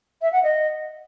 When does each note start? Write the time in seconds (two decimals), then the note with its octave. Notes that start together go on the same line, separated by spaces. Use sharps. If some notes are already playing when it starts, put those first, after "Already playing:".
0.22 E5
0.33 F#5
0.44 D#5